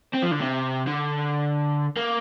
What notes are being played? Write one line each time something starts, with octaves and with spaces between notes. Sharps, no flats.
C4
F3
D3
C3
D3
A#3